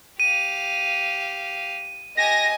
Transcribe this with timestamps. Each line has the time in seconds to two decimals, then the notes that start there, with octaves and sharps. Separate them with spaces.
0.20 G4 F5 D#7
2.17 G4 D#5 G#5 A#6